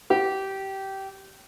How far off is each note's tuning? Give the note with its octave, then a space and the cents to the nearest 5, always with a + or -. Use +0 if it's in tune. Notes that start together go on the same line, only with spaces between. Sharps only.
G4 -20